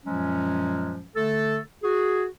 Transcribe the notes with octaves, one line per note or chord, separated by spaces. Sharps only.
F#2 A#2 F3 F#3 G#3 C#4
D3 A3 A4
F#4 G#4